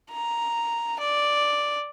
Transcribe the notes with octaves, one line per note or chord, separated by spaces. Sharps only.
A#5
D5